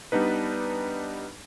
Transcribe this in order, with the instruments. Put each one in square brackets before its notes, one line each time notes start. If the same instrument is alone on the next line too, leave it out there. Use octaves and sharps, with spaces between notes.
[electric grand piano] G3 B3 D4 D#4 B4